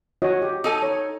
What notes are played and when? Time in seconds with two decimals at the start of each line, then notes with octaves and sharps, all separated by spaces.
0.22 F#4 C#5 D#5
0.42 G4
0.64 D#4 A4 G#5
0.82 C#5